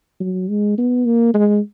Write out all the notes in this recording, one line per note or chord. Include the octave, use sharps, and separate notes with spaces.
F#3
G#3
B3
A#3
G#3